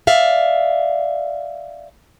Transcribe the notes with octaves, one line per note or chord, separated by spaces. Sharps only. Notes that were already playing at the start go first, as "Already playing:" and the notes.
D5 E5 F5